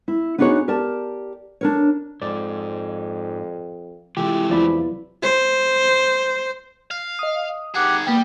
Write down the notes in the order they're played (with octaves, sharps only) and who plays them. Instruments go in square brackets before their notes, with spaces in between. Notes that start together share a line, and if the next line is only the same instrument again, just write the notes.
[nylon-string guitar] E4
B3 D4 D#4 F#4 G#4 C#5
G4 A#4 D5 A5
D4 A#4 C#5
[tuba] F2 [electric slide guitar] G#2 [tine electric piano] D5
[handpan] C3 E3 F4 [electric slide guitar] G#3 A3 [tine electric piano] G4
[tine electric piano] E2 D5 B5 [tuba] F3 [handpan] F#3 B3 E4
[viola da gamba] C5
[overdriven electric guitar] F5
[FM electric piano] D#5 D#6
[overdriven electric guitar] D#3 G#4 [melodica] G4 F#5
[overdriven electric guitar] G3 G4 [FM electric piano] A#3 G5 [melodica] B3